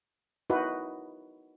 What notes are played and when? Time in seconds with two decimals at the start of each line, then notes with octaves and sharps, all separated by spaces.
0.50 D#4 E4 F#4 B4